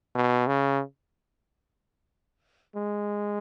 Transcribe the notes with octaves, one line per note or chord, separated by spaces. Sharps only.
B2
C#3
G#3